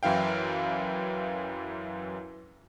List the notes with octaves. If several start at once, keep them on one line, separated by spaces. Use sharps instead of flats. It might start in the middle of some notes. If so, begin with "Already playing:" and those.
F#2 E3 E4 F5 G5